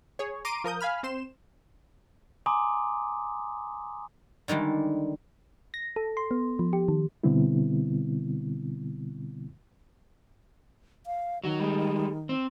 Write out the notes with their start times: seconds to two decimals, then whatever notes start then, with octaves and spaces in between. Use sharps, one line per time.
0.19 G#4 C#5
0.45 A#5 C6 D6 D7 D#7
0.64 F3 A#4 D#6 G6
0.80 F5 G#5 B5 F6
1.03 C4 C5 C6 E7
2.46 G#5 A#5 C6 D6 D#6
4.48 D3 D#3 G3 G#3
5.74 A#6
5.96 A4
6.17 C6
6.31 B3
6.59 F3
6.73 G4
6.88 D#3
7.24 B2 D3 G3 B3 C4 E4
11.06 F5
11.44 D#3 F#3 F#4
11.60 G3 G#3
12.29 C4